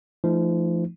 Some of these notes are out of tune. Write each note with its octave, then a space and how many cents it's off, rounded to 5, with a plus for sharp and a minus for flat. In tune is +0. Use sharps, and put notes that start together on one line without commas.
F3 -30 A3 +0 D#4 +0